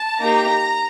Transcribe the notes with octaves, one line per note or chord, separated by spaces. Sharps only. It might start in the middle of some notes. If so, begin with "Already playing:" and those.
Already playing: A5
A#3 D#4 G4 A#5